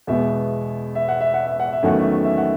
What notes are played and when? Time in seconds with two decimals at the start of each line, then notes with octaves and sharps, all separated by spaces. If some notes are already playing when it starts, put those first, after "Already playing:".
0.07 E2 B2 G#3 B3 E5
0.95 E5
1.08 F#5
1.21 E5
1.34 F#5
1.47 E5
1.60 F#5
1.73 E5
1.83 E2 D#3 F#3 A3 C#4 F#5
1.98 E5
2.11 F#5
2.24 E5
2.37 F#5